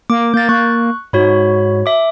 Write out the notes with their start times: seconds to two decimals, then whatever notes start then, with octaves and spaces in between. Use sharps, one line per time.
0.10 A#3 D6
0.34 A#3 G6 A6
0.49 A#3 C#6 F#6
1.13 G#2 F#4 C#5 B5
1.86 E5 D6